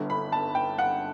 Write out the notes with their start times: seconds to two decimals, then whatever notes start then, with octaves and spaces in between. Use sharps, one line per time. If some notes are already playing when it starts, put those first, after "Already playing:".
Already playing: G1 G2 D3
0.10 B5
0.32 A5
0.55 G5
0.79 F#5